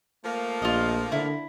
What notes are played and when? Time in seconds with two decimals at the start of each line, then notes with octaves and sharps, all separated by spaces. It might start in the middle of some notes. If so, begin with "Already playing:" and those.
0.25 F3 A3 A#3
0.62 A#1 F4 D#5
1.12 D3 E4